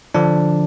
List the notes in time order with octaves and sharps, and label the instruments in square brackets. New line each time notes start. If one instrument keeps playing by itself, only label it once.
[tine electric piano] D3 F3 D4